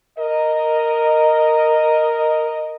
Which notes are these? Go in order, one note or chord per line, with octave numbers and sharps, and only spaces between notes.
A#4 D#5